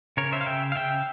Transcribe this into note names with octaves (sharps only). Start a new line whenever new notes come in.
C#3 A#4 C#5
C5 E5
F5
C#3 E5 G5
F5
C#3 E5 G5